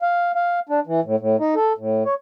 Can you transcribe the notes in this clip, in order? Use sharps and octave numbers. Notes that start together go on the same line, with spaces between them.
F5
F5
D4
E3
A2
A2
D#4
A4
A2
C#5